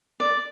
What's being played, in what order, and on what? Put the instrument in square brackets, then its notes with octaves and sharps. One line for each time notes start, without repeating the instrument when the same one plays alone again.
[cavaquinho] D5